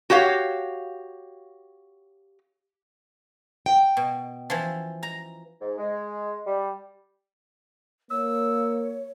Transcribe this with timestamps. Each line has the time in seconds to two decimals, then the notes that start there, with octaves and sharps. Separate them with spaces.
0.10 F#4 G4 C#5 F5
3.66 G5
3.97 B2
4.50 E3 F3
5.03 A#5
5.61 G#2
5.78 G#3
6.46 G3
8.11 A#3 C#5 E6